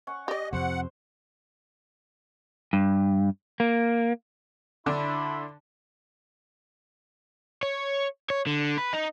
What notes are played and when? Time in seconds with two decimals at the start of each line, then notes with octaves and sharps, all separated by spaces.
0.07 C#4 F#5 C#6
0.28 G4 D5 D#5
0.53 F2 C3 C5 F#5
2.73 G2
3.60 A#3
4.86 D3 D4 E4 B5 C6
7.63 C#5
8.30 C#5
8.47 D3
8.78 B4
8.93 D#4